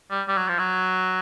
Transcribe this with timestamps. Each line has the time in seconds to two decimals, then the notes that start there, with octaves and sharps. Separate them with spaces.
0.11 G3
0.28 G3
0.37 F#3
0.49 F3
0.59 F#3